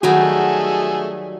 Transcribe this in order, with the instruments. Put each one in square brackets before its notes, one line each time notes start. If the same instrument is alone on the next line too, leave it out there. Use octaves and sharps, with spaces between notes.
[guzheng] D#3 F#3 G3 [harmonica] A3 G#4 A4 [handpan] F#4